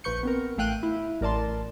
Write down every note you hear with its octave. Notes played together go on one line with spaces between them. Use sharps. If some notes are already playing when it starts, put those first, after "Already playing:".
A#1 F3 B4 C#6 G6 C#7
B3 C4 A#4
A1 A3 F5 G5 F#6 D#7
E4
A1 A#4 D5 A5 C6